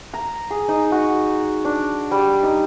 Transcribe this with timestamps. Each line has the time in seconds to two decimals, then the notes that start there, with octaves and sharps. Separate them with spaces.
0.14 A#5
0.51 G#4
0.69 D#4
0.92 F#4
1.65 D4
2.11 G3
2.43 D#4